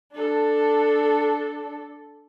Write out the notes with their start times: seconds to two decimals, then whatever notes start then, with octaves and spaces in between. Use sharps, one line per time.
0.13 D4 A4